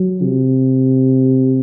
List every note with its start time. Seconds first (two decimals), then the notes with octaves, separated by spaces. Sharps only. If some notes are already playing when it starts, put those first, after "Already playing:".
Already playing: F#3
0.23 C3